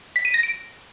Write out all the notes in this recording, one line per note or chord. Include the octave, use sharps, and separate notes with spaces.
B6
D#7
A#6
D7